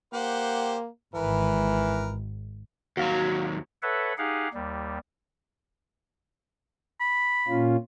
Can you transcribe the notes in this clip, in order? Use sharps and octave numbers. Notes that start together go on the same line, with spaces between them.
A#3 G4 C5 F#5
G#1 E3 A#4 B4
D#2 F#3 F#4 F5
A4 B4 C#5 E5 F#5
D#4 G4 G#4 F5 F#5
D#2 G3
B5
A#2 C#4 F4